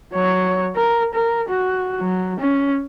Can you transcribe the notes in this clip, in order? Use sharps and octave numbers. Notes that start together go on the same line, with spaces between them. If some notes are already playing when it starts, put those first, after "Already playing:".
F#3 C#5
A#4
A#4
F#4
F#3
C#4